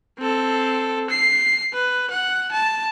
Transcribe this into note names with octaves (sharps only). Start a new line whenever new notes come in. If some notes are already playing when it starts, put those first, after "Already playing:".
C4 A4
C7
B4
F#5
A5